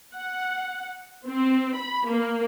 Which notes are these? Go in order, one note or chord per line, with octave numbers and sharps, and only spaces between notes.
F#5
C4
B5
A#3